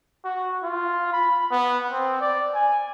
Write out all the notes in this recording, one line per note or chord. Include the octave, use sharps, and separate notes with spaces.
F#4
F4
B5
B3
C4
D5
G#5